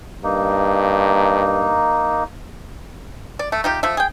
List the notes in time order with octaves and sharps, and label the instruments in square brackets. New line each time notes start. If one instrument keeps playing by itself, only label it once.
[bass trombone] G2 [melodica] A#3 D#4
[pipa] D5
A3
D#4 F4 G4
F3 A3 E5
G#4 G5